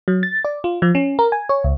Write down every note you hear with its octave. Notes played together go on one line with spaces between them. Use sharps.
F#3
A6
D5
F4
F3
C#4
A#4
G#5
C#5
C#2